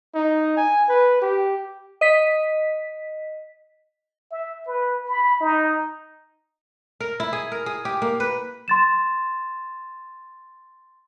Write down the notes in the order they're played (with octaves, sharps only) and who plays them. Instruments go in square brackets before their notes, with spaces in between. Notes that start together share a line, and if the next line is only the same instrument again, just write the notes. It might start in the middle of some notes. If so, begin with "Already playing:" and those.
[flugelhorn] D#4
G#5
B4
G4
[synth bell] D#5 B6
[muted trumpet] E5
B4
B5
D#4
[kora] A#4
E4
G#4
A#4
G#4
G4
A#3
B4
[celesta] C6 A6 E7